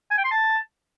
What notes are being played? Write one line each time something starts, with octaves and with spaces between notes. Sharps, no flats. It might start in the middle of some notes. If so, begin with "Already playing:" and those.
G#5
G5
C6
A5